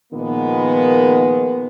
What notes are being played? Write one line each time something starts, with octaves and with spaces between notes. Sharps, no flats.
A#2 D#3 F3 G#3 A#3 B3